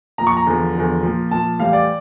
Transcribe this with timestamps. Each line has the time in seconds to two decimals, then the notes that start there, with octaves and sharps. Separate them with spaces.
0.18 A#2 F3 A#5
0.27 C#6
0.37 A#5
0.46 E2 D3 F3
0.75 E2 D3 F3
1.03 A#2 F3
1.31 A#2 F3 A5
1.59 A2 E3 G3 F5
1.73 D5